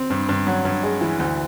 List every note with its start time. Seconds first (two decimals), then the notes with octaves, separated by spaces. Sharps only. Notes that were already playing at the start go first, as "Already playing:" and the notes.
Already playing: C4
0.10 G2
0.29 G2
0.47 F#3
0.65 G2
0.83 G#3
1.01 E3
1.19 D2